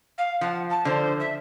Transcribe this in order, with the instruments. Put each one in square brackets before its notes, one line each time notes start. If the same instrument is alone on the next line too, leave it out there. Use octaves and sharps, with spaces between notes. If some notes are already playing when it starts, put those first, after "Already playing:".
[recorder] F5
[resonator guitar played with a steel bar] F3 [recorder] F#5
[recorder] A5
[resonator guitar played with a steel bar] D3 F3 [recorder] C5
[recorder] E5